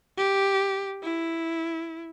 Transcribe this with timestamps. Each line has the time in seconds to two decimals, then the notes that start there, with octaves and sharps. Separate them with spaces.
0.17 G4
1.03 E4